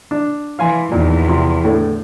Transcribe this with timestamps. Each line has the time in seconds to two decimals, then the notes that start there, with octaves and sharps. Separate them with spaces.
0.11 D4
0.59 E3 F5 G#5 C6
0.92 E2 A#2 D#3
1.28 C3 F3 C6
1.64 A2 D3 A3